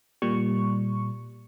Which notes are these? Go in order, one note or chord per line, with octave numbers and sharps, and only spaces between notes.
A#2 G3 C#6